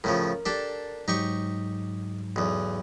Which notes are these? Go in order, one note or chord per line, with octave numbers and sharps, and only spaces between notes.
A2 C#3 F3 A#4
D4 G4 A4
G#2 F#3 D#4 G4 C#6
B1 E2